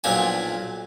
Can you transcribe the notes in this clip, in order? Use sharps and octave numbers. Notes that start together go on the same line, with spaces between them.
B1 A#2 F3 D4 G#5